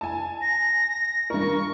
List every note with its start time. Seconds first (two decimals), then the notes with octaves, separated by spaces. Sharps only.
0.01 G#5 A5
0.41 A#6
1.30 G2 A#4 C#6